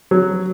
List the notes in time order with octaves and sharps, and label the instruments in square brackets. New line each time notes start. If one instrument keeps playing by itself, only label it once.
[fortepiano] F#3